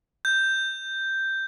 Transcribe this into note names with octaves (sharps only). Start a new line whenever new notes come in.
G6